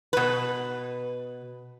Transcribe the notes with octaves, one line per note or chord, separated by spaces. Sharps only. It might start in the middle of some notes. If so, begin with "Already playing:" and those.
B2 B4